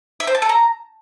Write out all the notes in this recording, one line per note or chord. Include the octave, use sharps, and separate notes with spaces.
E5
C5
A5
A4
A#5